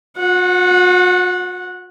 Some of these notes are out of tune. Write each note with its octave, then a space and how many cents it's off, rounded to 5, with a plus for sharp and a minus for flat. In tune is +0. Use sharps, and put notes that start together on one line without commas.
F#4 -45 F#5 -10